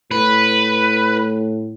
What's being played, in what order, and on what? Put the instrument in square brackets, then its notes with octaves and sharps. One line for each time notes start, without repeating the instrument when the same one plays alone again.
[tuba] A2 [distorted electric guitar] B4